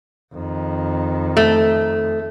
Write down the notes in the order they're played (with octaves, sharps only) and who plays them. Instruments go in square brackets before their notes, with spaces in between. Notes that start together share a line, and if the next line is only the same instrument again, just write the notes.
[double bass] F2 D#3
[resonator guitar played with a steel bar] A3